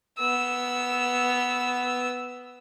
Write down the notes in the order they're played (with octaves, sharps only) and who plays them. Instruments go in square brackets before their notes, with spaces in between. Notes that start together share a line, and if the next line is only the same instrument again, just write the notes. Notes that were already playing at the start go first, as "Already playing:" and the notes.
[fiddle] B3 E6